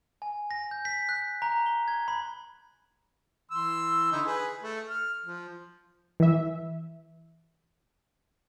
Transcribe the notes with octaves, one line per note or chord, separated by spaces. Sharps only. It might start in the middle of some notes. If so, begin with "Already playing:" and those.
G#5
A#6
G6
B6
F#6
A#5
G7
G#6
B5
E3 C6 E6
D3 D#4 E4
G#4 B4
A3
F6
F3
E3 E5